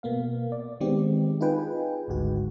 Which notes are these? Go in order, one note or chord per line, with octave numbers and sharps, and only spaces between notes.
B2 A#3 B3 F5
D5
D#3 G#3 B3 C4 G4 D5
D#4 F4 G#4 B4 G5 G#5
G#1 D2 G#2 F#4